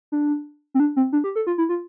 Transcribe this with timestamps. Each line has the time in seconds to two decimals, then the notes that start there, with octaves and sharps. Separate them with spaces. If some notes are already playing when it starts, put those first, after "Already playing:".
0.12 D4
0.74 C4
0.80 D4
0.96 C4
1.13 D4
1.24 G4
1.36 A4
1.47 F4
1.58 E4
1.69 F4